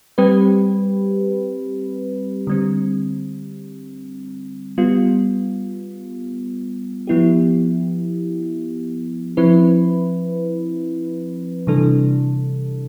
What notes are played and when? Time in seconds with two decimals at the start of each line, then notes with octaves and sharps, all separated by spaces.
0.18 G3 C4 G4 B4
2.47 D3 G3 C4
4.78 G3 B3 F4
7.07 F3 B3 E4 G4
9.37 F3 C4 E4 B4
11.67 C3 E3 G3 D4 A4